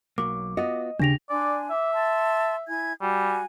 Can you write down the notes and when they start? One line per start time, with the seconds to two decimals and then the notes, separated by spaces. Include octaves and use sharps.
0.18 B1 F#3 A#3 D6
0.57 B3 F4 F#4 D#5
1.00 D#2 C#3 D4 G4 A#6 F7
1.30 D4 D5 G#5 C6
1.70 E5 D6
1.93 A5 C6
2.68 E4 G#5 G#6
3.02 G3 F#4 G#5